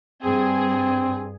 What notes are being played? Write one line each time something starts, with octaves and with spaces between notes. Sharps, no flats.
G2 C4 G#4